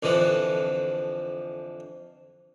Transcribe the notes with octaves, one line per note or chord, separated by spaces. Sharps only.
F2 D3 E3 F3